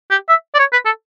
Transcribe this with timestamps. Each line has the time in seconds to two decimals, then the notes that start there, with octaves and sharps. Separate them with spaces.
0.11 G4
0.29 E5
0.55 D5
0.59 C#5
0.73 B4
0.85 A4